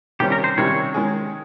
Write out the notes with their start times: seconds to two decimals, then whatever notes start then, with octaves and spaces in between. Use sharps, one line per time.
0.20 C3 D#3 G3 C#4 G4
0.32 A#4
0.44 C5
0.58 C3 D#3 G3 C#4 C#5
0.94 D#3 G#3 C#4 G#4